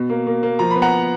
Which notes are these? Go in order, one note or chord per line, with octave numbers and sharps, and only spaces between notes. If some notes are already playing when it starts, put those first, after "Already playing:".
Already playing: B2
A#3
A#3
A#3
F3 A#5
B5
B3
F#5 A#5